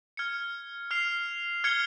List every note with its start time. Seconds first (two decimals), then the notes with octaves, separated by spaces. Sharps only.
0.17 F6 G#6 C#7
0.91 F6 C7 F7
1.64 F6 G#6 C#7 G7